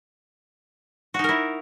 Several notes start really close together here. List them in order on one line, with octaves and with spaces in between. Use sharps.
F#4 D#4 A#4 E4